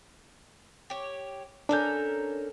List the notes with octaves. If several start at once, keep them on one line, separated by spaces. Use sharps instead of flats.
G4 C#5
C#4 D4 A4 A#4 G6